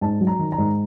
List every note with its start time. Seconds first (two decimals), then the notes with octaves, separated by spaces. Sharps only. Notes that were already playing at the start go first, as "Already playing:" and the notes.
0.01 G#2 A5
0.20 F#3
0.27 A#5
0.39 D#3
0.52 A#5
0.58 G#2